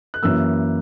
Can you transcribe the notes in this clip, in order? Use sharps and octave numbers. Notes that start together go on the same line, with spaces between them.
F#6
F#2 E3 A#3 E6